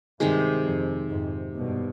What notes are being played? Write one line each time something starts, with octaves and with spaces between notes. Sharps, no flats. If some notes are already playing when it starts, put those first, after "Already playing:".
G2 C3 D#3 G#3
F2 G#2
F2 G#2
G2 B2